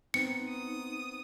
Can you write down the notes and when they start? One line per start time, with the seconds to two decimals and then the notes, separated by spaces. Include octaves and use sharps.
0.14 B3 C4 D#4 C#7
0.48 D#6